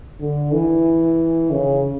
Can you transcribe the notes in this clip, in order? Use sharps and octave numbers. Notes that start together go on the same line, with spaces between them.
D3
E3
C#3